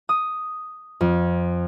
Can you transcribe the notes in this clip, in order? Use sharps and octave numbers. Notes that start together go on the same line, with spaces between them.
D#6
F2